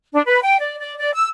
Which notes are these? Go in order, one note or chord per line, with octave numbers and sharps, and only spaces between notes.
D4
B4
G5
D5
D5
D5
E6